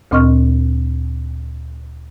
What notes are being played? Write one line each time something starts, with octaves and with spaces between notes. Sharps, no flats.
D2 A#2 C4 D#5 C#6 F6